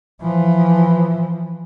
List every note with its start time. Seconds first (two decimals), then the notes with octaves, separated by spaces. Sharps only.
0.21 E3 F3